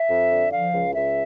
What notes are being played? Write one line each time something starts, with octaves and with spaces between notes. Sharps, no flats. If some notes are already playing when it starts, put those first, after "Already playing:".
Already playing: E5
F2
D3
F3 F5
C#2
C#2 E5